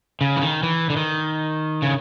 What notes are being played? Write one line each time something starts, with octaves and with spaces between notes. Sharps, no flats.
C#3
E3
D#3
E3
D3
D#3
C#3